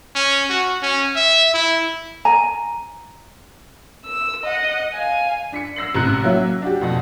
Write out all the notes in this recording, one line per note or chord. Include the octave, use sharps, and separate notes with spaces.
C#4
F#4
C#4
E5
E4
G#5 A#5
E6
D#5 F#5
F5 G#5
D4 B6 C#7
E6 A#6 C7 F#7
A1 C3 A#5 F#6 C#7
F#3 A#3 C#4 E5
D4 F#4 G4
F2 B2